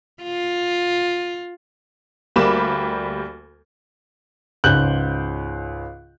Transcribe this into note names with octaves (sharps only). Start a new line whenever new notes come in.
F4
D2 G3 A#3 B5 D6 E7
C#2 G#2 F#6 G6 F#7